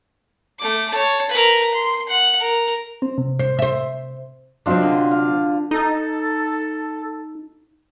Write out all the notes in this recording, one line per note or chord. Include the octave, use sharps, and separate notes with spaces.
A3 D6
C#5 A5
A#4 B4
C6
F#5
A#4
C4
C3
C5
C5 E5
C3 F#3 C4 D4 F4 D#5
D3
F5
D#4 A4